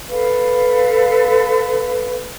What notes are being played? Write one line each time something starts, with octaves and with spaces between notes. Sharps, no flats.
A4 B4 F5